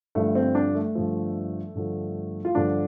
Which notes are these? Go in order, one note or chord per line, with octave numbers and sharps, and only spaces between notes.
G2 D3 F3 A3
C4
D4
A3
G2 D3 F3
G2 D3 F3
F4
G2 D3 F3 D4